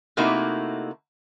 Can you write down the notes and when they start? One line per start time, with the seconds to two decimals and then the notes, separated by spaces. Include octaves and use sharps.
0.17 C3 A3 A#3 D#4 E4 F#4